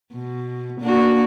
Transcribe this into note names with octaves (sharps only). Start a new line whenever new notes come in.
B2
A#3 D4 F#4